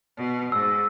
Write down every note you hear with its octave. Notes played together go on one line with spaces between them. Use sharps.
B2
G#2 E6